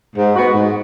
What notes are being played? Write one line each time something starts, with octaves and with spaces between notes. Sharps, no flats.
G#2
G#3 B3 F#4
G#2